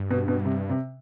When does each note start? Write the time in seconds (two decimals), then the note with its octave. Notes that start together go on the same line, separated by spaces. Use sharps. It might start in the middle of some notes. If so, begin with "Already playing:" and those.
Already playing: G2
0.10 B2
0.28 B2
0.45 C3
0.69 C3